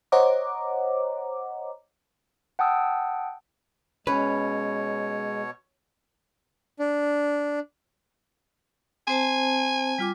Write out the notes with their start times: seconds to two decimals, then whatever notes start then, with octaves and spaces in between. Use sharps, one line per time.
0.12 C5 C#5 D#5 F#5 A#5 D6
2.59 F#5 G5 A5 D#6 E6
4.07 B2 G#3 C#4 B4 C#5
6.79 D4
9.07 C4 C5 G#5 A5
9.99 G3 F4 D6